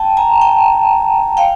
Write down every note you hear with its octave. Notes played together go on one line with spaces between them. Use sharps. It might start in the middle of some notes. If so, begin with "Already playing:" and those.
Already playing: G5 A5
G#5 A#5
G5 A5
F5 G5